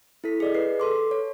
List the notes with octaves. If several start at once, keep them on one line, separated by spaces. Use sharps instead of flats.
E4 A4 B6
G#4 D5 D#5
G#4 B4 C7
A4 C6 D6
C#5